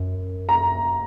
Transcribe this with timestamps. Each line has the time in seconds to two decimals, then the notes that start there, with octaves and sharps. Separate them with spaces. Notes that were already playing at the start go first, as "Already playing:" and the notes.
Already playing: F#2
0.49 A#5